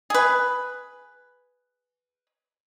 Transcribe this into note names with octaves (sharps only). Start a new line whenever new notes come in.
G#4 B4